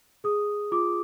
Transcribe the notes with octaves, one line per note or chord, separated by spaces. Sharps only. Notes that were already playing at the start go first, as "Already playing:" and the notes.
G#4 D#6
F4 D6